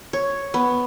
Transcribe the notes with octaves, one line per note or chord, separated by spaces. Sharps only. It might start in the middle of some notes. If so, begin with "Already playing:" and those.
C#5
B3